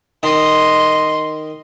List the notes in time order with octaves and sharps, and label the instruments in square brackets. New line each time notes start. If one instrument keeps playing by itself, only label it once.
[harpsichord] D#3 [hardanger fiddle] D#5 C6